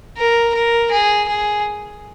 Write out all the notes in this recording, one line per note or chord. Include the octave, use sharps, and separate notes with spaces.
A#4
A#4
G#4
G#4